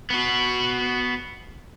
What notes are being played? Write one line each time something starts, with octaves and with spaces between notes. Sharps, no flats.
B3 F#4